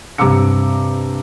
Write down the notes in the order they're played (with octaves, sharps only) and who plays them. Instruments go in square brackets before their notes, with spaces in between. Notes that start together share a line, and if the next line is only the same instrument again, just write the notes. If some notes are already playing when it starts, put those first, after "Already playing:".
[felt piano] G2 C3 A#5 D6 E6 C#7